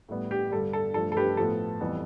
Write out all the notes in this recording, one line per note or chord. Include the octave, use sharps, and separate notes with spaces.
A2 G3 B3
G4
G2 D3 G3 A4
A4
G2 F3 A3 A4
A4
G4 B4
A2 F3 B3 A4
F2 E3 G3 B3